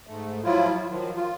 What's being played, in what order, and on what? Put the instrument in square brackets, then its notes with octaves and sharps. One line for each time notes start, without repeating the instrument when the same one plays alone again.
[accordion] G#2 A3
F3 F#3 E4 F4
F#3
D#3 F3 F#3
F4